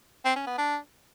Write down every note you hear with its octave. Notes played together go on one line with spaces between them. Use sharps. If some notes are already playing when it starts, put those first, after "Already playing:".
C4
C#4
B3
D4